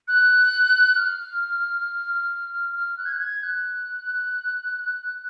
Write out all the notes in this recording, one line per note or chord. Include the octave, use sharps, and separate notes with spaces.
F#6
F6
F6
F#6
G#6
F#6
G#6
F#6